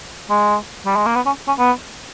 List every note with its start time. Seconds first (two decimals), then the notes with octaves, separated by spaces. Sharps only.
0.30 G#3
0.86 G3
0.96 G#3
1.06 A#3
1.16 B3
1.26 C#4
1.48 C#4
1.58 B3